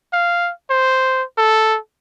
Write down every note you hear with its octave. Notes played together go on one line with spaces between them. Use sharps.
F5
C5
A4